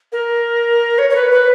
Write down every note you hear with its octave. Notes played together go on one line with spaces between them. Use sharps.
A#4
C#5
C#5
B4
B4